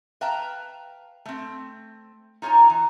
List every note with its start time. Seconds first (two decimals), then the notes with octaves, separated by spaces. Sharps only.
0.21 B4 E5 F5 G5 A5 A#5
1.25 A3 C4
2.42 D#4 F4 C#5 G#5 A#5
2.70 E3